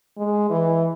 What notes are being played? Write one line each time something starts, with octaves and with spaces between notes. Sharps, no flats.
G#3
E3